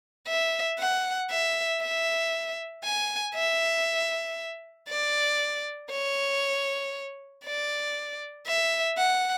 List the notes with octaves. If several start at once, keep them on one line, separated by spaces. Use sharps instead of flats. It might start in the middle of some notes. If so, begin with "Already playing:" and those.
E5
F#5
E5
E5
G#5
E5
D5
C#5
D5
E5
F#5